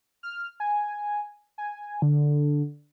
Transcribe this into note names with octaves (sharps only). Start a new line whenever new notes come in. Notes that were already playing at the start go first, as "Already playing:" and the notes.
F6
G#5
G#5
D3